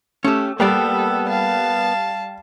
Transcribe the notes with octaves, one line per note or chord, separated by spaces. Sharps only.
A3 C#4 G4
G3 A#3 B3 A4 D5
F5 A5